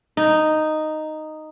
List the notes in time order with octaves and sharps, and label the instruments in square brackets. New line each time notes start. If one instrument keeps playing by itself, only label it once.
[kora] D#4